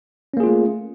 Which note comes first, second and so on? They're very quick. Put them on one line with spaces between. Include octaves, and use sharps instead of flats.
C#4 A#3 G#4 F4 A3